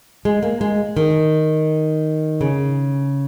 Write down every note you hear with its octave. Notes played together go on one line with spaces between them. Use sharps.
G#3
A#3
G#3
D#3
C#3